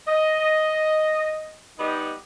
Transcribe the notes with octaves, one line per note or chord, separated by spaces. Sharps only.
D#5
G3 B3 D#4